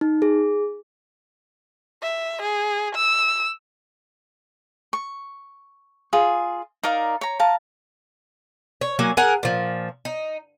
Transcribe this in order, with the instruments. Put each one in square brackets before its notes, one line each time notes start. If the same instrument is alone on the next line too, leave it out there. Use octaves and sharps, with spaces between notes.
[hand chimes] D#4
G#4
[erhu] E5
G#4
E6
[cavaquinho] C#6
F4 G#4
D#4 A#4 D5 F5
C#5 A#5
F5 A5 A#5
[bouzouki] C#5
F#3 A#3 F#4 G#5
G#4 A#4 F#5
A#2 F3
D#4